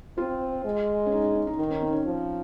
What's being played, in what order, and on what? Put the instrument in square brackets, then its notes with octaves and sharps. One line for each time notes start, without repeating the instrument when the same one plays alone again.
[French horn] C4 [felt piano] F4
[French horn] G#3
[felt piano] C#4
D#4
D#4
C#4
D#4
[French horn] D#3 [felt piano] D#4
[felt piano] C#4
C4
C#4
[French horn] F3